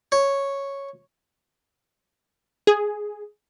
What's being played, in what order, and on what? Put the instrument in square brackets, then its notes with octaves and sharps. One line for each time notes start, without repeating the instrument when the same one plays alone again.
[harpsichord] C#5
[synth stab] G#4